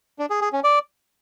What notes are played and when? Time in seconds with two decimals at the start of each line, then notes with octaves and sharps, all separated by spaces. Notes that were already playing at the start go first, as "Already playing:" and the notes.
0.19 D4
0.30 G#4
0.41 G#4
0.53 C#4
0.64 D5